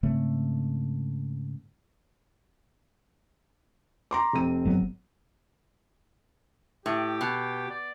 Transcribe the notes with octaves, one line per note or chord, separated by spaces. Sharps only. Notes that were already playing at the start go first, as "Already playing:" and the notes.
G#2 C#3 A3 C4
A#5 C6 D6
F1 C4 D#7
G1 F#3 B3
A2 G4
B2
D5